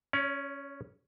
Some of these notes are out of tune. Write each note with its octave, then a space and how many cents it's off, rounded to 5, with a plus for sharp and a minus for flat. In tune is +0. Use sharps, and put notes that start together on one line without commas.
C#4 +0 C#5 +45